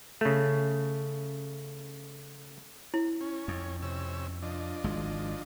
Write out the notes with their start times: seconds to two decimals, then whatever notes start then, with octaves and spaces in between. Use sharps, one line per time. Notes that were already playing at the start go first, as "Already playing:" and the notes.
0.21 C#3 A3
2.94 E4
3.21 C#4
3.48 F2
3.82 C3 C#4 E6
4.42 F3 D4 D#5
4.84 G#1 G#3